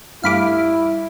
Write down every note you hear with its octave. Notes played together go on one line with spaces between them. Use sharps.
G2 G3 A3 E4 F5 B5 D6